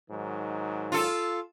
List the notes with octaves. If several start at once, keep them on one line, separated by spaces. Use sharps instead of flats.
G#2 D#3 F#3
F4 A4